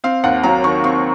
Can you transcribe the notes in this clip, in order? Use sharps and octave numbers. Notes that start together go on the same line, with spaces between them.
C4 F5
D#2 F#5
F#3 A#5
D#3 C#6
C4 C#6